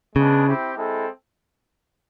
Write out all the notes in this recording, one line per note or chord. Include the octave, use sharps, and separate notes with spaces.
C#3 G#3 B3 D4
C4 E4 G4
G#3 C4 E4 A4